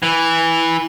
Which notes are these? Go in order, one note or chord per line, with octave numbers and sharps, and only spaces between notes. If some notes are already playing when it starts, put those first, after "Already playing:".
E3